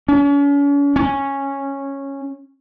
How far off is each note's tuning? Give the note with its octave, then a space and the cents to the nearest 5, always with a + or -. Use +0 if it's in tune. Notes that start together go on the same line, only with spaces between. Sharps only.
C#4 +40
C#4 -10